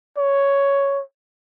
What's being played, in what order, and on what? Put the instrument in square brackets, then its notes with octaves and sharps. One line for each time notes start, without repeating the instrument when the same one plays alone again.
[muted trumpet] C#5